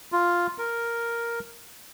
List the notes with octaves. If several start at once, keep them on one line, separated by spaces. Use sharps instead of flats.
F4
A#4